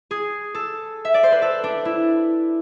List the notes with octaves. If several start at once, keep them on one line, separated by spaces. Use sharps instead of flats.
G#4
A4
E5
D5
C5
B4
A4
D4
E4